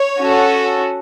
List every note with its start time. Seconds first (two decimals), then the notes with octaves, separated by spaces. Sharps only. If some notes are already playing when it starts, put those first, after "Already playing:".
Already playing: C#5
0.19 C#4 F#4 A4